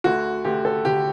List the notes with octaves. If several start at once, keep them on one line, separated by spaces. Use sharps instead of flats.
D2 D3 F#4
D2 D3 G4
A4
D2 D3 G4